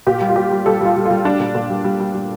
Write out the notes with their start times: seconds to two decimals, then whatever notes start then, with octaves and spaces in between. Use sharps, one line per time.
0.07 A#2 G4
0.21 G3
0.29 F4
0.36 G3 G4
0.51 G3
0.66 G3 A4
0.81 G3 F4
0.96 G3
1.05 F4
1.11 G3
1.25 G3 D4
1.40 A#2
1.55 A#2
1.70 G3
1.84 G3
2.00 G3
2.14 G3